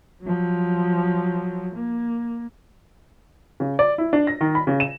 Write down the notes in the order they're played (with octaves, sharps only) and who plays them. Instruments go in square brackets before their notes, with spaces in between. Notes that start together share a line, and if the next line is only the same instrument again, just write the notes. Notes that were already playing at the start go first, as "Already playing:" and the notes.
[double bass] F3 F#3
A#3
[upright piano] C#3
D5
E4
D4
A#6
D#3
B5
C#3
E7